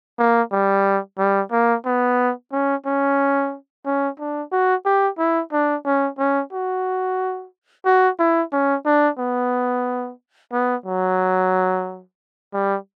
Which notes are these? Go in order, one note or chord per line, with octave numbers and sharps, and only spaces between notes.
A#3
G3
G3
A#3
B3
C#4
C#4
C#4
D4
F#4
G4
E4
D4
C#4
C#4
F#4
F#4
E4
C#4
D4
B3
B3
F#3
G3